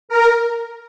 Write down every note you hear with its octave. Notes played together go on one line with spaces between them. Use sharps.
A#4